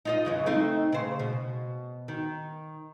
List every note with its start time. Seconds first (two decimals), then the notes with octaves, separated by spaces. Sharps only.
0.05 D#4 F4 D#5
0.25 F#2 C#3 E3
0.46 A3 C4 D#4
0.93 C#3 C5
1.19 B2
2.08 D#3